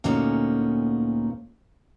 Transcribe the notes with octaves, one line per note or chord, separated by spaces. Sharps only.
D2 A#2 A#3 B3 C#4 D#4